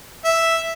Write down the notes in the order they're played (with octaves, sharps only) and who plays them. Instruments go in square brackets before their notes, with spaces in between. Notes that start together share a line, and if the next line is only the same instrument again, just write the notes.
[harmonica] E5